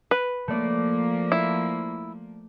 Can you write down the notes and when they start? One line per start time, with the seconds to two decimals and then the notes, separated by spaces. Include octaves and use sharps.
0.11 B4
0.48 F3 A3 A#3 D5
1.32 E4